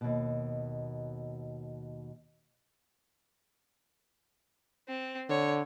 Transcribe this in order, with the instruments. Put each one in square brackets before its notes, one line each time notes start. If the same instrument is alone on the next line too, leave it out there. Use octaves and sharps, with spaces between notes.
[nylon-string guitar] D#2 B2
[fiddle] C4
[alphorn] D3 [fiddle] C#5